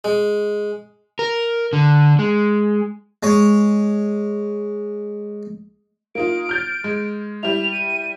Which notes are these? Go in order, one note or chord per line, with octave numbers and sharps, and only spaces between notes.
G#3
A#4
D3
G#3
G#3 C#5
A#3 D#4 F4 D7
F6 G6 A6
G#3
G3 E4 F7
D#7